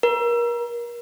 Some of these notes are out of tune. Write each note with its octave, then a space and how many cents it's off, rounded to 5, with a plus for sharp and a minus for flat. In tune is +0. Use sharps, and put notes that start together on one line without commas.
A#4 +30